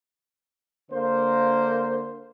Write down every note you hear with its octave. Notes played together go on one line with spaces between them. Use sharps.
D3 A#3 C5